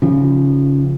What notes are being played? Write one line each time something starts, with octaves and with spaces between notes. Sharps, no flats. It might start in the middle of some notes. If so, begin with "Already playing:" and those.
C#3 F3